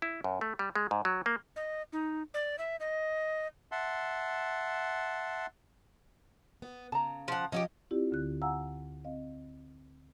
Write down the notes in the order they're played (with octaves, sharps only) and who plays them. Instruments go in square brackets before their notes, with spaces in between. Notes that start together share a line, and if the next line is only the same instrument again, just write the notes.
[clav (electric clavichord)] E4
F#2
A3
G3
G#3
G#2
F#3
A#3
[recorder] D#5
D#4
D5
E5
D#5
[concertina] E5 F#5 A5 C6
[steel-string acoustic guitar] B3
[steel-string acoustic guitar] C#3 [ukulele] A5 A#5
[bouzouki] F3 F#5
[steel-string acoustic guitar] F3 D#5 [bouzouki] C#4 F#4 G4
[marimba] C4 E4 F4 G4 D5
D2 D3 F#6
F5 F#5 G#5 A#5 E6
C4 D#5 F5